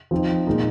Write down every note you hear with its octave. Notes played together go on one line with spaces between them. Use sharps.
F3 C4 D#4
A#2 G#3 D#4